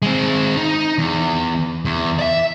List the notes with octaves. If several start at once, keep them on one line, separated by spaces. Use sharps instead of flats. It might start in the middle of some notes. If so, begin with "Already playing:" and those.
G#3 C4
D#4
E2
E2
D5 E5